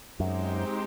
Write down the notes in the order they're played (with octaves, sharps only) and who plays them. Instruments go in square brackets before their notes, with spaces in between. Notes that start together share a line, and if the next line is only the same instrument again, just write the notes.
[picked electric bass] F#2 [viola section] G#3 C4 D#4 G4 C5